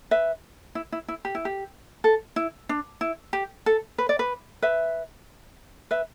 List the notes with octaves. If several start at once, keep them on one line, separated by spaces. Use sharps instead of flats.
B4 E5
E4
E4
E4
G4
E4
G4
A4
E4
D4
E4
G4
A4
B4
D5
B4
B4 E5
B4 E5